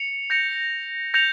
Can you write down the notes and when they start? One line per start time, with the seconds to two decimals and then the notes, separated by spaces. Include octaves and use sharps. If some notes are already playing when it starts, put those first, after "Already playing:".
Already playing: C#7 F7
0.30 G6 A#6 C#7 F7
1.14 G6 A#6 C#7 F7